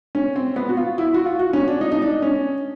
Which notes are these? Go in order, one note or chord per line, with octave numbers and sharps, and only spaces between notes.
C#4
C4
B3
F#4
F4
E4
F#4
F4
F#4
C#4
D4
D#4
D#4
D4
C#4